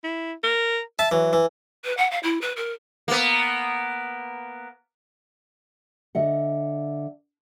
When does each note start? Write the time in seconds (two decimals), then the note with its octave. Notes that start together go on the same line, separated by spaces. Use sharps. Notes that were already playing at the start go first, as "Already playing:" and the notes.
0.04 E4
0.43 A#4
0.99 E5 A5
1.12 E3 F#3
1.33 E3
1.85 B4
1.97 F#5
2.11 F5
2.23 E4
2.41 B4
2.56 A#4
3.08 A#3 B3
6.15 D3 D#5 E5 F#5